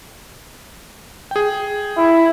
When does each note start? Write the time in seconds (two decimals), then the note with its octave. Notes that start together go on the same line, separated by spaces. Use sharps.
1.31 G#4 G5
1.98 E4